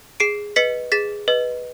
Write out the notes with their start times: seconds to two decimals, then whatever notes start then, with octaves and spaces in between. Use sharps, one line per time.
0.20 G#4 C7 D7
0.56 B4 D#5 B6 C#7
0.92 G#4 A6 B6
1.28 B4 D#5